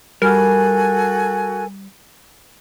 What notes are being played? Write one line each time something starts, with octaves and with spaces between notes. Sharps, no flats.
G3 F#4 A4 A#4 G#5